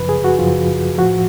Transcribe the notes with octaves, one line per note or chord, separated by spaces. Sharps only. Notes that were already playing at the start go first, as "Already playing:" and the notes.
Already playing: F#2 C#3 F3 B4
G#4
F#4
F#2 C#3 F3 F4
A2 F3 F#4